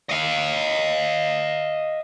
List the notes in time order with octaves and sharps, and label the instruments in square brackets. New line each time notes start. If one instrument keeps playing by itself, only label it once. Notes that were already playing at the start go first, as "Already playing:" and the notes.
[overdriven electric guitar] D#5 F5